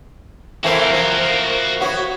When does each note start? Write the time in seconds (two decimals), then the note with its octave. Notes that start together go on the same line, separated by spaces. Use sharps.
0.64 E3 A3 C4 F#4 A#4 F5
0.93 F3
1.80 B3 F#4 C#5